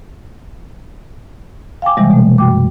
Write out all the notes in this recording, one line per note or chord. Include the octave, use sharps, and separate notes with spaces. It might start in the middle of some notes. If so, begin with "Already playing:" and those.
F5 G5 G#5 D6
C3 E3 G3 G#3
B2 A3
F#2 G5 D6